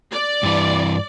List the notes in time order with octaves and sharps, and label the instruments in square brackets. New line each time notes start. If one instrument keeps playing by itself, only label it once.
[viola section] D5
[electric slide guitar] G2 E3